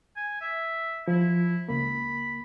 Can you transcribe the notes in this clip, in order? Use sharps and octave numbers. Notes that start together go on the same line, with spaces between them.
G#5
E5
F3 E4
C#2 A#3 B5